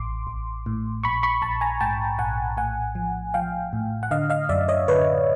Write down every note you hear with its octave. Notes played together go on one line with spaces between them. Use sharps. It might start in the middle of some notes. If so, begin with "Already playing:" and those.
Already playing: A1 C6 D6
A1
A2
A#1 B5 C#6
B5 C#6
A#1 A5 B5
G#5 A#5
G#2 G5 A5
A#1 F#5 G#5
A2 F#5 G#5
F3
F3 F5 G5
A2
F#5
D3 D#5 F5
D#5 F5
F#2 D5 E5
C#5 D#5
D3 B4 C#5